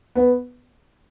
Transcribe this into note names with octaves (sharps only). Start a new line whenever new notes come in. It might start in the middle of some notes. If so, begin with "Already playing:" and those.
B3